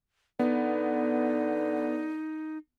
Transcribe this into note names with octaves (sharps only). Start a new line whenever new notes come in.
D3 B3 D#4